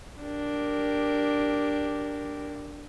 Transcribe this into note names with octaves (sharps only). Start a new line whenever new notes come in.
D4 G4 A#4